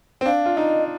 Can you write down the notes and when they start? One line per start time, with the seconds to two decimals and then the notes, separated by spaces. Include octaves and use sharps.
0.21 C4
0.26 D4 F5
0.46 F4
0.57 D#4 D#5